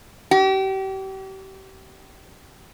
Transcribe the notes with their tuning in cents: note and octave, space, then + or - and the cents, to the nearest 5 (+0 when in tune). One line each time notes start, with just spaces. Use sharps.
G4 -35